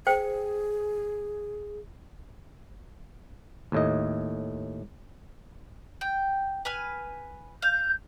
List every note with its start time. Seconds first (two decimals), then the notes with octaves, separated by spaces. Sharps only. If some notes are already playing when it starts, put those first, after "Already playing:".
0.07 G#4 C5 G5
3.72 D#2 A2 D#5
6.01 G5
6.65 B4 G#5 F6
7.62 F5 G6